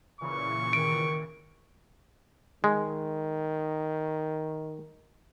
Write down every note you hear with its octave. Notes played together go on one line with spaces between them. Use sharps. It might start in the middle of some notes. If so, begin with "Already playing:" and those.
A#2 C#3 E3 C#6
D#3 D7
D#3 G#3